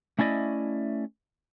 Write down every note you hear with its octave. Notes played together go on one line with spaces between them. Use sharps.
A3 C#4 E4 D5 D#5